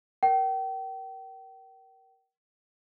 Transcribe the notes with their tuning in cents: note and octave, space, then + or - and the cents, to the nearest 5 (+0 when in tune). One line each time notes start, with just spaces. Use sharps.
A#4 +10 G5 -35